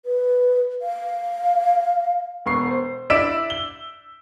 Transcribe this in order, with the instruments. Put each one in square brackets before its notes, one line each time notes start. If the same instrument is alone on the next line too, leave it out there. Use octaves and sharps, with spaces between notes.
[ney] B4
F5
[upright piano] E1 B3 C#6 C7
C5
E4 D5 E6 B6 D7 E7
G7